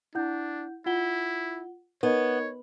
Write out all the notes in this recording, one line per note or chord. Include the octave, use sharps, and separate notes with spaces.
D4 E4 F#5 G6
E4 F4 F#5 G7
B3 D#4 A#4 C#5 D#5